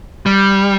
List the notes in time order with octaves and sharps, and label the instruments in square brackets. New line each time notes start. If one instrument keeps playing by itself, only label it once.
[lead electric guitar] G3